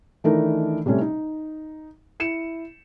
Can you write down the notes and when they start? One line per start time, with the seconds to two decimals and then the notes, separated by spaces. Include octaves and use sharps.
0.24 D#3 E3 A3 D4 D#4 A#4
0.86 C3 G3 A3 C#4
1.01 D#4
2.20 E4 C#7 E7